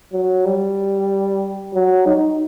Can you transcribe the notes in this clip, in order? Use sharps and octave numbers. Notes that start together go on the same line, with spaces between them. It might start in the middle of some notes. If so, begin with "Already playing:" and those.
F#3
G3
F#3
D#4